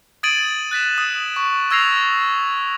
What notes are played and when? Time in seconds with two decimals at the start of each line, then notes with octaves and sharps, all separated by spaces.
0.23 D#6 G#6 A6 D7 D#7 F#7
0.71 F#6 A6 B6 E7
0.98 D#6
1.36 C#6
1.71 C#6 E6 G#6 A#6 C7 F7